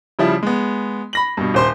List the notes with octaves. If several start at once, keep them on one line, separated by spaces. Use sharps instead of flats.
C#3 F3 G3 E4
G#3 B3
B5 A#6 F#7
G2 B2
D#1 C5 C6